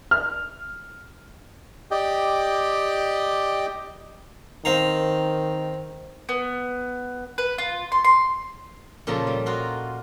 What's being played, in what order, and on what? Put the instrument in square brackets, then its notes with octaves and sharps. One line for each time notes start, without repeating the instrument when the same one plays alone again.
[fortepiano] F6
[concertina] G4 D5 D#5 G5
[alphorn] D#3 [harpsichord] C4 F5 A#5
[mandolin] B3
B4
F4
C6
C6
[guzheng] A#2 C#3 F3 F4 A4 A#5
G3
F4 F#4 A#4 D#5 F5